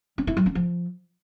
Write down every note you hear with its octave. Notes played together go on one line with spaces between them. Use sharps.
C#4
E4
F#3
C#4
F3